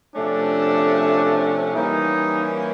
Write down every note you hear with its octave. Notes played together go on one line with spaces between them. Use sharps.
C3 F3 A3 C#4 D4
E3 G3 A#3 C#4 D#4